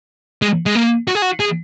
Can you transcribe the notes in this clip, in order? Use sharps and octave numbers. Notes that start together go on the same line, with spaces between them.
G#3
G#3
A#3
F#4
G#4
F#4
G#4